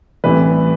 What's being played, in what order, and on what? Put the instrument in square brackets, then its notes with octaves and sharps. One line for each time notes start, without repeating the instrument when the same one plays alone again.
[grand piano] A1 A2 E3 G3 C4 B4